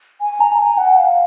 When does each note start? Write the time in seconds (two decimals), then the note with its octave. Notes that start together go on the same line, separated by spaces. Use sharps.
0.21 G#5
0.40 A#5
0.59 G#5
0.78 F#5
0.97 F5